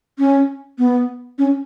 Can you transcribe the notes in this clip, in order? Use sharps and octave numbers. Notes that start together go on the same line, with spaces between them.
C#4
B3
C#4